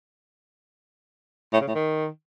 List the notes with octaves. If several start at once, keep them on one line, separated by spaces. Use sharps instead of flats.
A2
C#3
A2
D#3